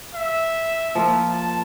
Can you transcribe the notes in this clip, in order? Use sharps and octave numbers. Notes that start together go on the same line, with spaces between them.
E5
F3 A#3 F4
A5